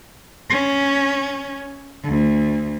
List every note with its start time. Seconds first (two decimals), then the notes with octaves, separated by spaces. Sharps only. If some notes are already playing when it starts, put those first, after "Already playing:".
0.50 C#4
2.03 D2